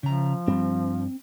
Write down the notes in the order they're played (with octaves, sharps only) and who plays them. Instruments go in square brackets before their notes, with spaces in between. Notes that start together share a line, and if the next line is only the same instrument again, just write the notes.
[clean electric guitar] C#3 A#5 [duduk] F3
[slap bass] G2 G3 [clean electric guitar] C4